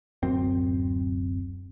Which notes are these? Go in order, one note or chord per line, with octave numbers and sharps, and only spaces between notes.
D1 F#2 C4